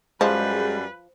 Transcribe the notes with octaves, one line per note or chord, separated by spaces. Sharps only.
F#2 F3 G3 G#3 B4